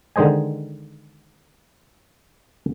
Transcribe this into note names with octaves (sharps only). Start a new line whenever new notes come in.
D3 D#3 G#3 C5 D#5 G#5